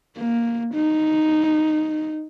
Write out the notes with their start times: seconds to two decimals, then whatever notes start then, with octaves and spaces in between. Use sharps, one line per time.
0.16 A#3
0.74 D#4